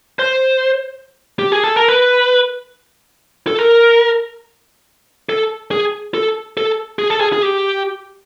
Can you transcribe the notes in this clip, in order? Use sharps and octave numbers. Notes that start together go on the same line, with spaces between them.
C5
G4
G#4
A4
A#4
B4
A4
A#4
A4
G#4
A4
A4
G#4
A4
G#4
G#4
G4